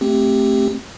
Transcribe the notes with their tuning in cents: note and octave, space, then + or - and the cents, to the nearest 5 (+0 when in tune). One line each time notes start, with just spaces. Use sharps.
A3 +0 C4 +0 G4 +0